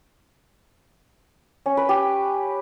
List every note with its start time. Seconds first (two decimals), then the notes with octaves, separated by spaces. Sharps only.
1.66 C#4
1.77 B4
1.89 G4